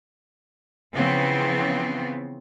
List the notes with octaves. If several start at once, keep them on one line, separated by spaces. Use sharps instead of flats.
C#3 E3 F3 B3 C4